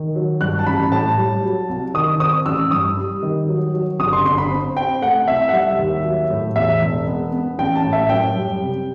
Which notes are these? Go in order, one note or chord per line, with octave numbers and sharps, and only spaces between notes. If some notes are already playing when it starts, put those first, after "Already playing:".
Already playing: D#3
F#3
G2 F#6
A5
A1 B5
A2 A5
G3
F#3
C2
D#3 D#6
C4 D#6
A1 E6
G2 D#6
G3
D#3
F#3
F#3
G1 D#6
C6
G1 C6
B5
C4
C4 G5
A3 F#5
C2 E5
F#5
G3 E5
D#2
F#3
A2
E2 E5
E1
B3
B3
A1 G5
A5
A2
E5
F#2 G5
G3
C3